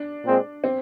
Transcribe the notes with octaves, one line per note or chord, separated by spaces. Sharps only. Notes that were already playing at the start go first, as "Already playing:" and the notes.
Already playing: D4
A#2 G#3 C4
C4